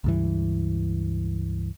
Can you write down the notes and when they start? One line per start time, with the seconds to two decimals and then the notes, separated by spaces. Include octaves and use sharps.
0.04 C#2 G2 E3